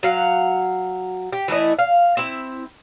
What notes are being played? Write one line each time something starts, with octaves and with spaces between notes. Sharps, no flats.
F#3 F5 F#5
G4
E3 A3 E4 D#5
F5
C4 E4